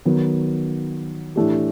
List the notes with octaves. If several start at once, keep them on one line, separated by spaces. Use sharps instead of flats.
D#3 F#3 B3
A2 E3 A3 D4 G4